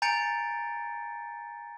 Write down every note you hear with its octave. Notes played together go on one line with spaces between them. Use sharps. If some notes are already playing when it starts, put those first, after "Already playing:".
G#5 A#5 G6 A6 C#7 D7